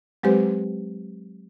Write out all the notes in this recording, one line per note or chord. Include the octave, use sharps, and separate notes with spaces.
F#3 G#3 C4 G4 B4 C5